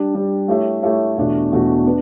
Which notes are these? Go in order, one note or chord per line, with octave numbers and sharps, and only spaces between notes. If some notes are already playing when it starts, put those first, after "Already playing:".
Already playing: G3 D4 G4
G3 D4 G4
A3 E4 G4 C#5 E5
A3 E4 G4 C#5 E5
E2 B2 A3 D4 F#4
E2 B2 A3 D4 F#4
B3 D4